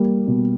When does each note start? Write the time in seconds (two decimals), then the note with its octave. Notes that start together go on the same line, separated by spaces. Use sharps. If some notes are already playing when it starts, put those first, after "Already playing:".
Already playing: G3 A#3
0.27 B2